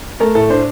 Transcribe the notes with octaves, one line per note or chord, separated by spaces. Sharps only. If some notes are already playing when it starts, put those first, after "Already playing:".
A3 A#4
A2 A4
D4 C5